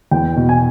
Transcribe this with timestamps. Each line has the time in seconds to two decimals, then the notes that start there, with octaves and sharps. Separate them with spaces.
0.11 E2 G5
0.36 B2
0.49 G#5